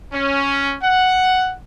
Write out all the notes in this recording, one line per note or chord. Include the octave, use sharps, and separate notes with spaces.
C#4
F#5